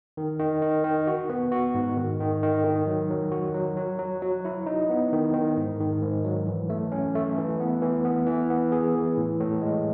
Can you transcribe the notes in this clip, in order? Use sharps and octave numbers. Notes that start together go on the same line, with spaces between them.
D#3
D#3
D#3
D#3
F#4
B3
F#4
G#2
D#3
D#3
D#3
D#3
F#3
F#3
F#4
F#3
F#3
F#3
F#3
E4
D#4
B3
D#3
D#3
G#2
D#3
G#2
F#3
E3
A3
C#4
A3
E3
B3
E3
B3
E3
B3
G#4
E3
A2
A2
G#3